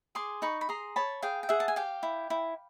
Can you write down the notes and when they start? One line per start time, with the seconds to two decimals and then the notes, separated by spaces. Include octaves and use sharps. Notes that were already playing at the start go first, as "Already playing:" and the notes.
0.15 G#4 C6 D6
0.42 D#4 B5 C#6
0.61 B5
0.69 G#4 A#5 C6
0.96 C#5 A5 B5
1.22 G#4 F5 G5
1.43 G5
1.49 G#4 E5 F#5
1.60 A5
1.68 G#5
1.76 G4 F5 G5
2.03 E4
2.30 E4